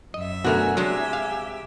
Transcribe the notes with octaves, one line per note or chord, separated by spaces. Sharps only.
F#2 D#5 E5
B2 D3 A3 F#4 A#4 G#5
C3 F#3 G#3 D4 G4 E5
F5